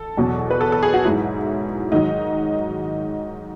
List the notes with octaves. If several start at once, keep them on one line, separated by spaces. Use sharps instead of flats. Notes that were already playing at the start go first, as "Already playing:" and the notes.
Already playing: A4
E2 B2 F#3
B4
A4
A4
G#4
F#4
G#2 F#3 E4
G#2 D#3 F#3 D#4